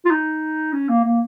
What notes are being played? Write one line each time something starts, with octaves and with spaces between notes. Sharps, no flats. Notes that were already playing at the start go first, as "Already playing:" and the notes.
F4
D#4
C#4
A#3
A#3